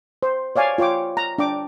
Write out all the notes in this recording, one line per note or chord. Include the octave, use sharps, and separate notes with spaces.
C5
C#5 D5 F5 G#5
F4 C#5 G5 D6
A#5
D4 G5 D6